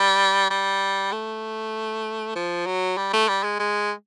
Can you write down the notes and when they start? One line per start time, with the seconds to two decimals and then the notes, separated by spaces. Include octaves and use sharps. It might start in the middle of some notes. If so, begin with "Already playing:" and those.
Already playing: G3
0.50 G3
1.12 A3
2.35 F3
2.66 F#3
2.97 G3
3.13 A3
3.28 G3
3.44 G#3
3.59 G#3